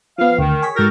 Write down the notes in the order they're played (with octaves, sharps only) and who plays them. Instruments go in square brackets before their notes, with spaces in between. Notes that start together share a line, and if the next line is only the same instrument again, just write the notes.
[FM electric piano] F3 B3 [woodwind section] F5
[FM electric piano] D2 [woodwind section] D#3
[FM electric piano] G#4 C#5 B6
[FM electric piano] G#2 G5 A#6 [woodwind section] F#4 A4 A#4